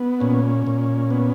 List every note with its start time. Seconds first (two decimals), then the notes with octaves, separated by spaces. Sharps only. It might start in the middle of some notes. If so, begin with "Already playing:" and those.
Already playing: B3
0.20 A#2 C#4
0.67 A#2
1.10 B3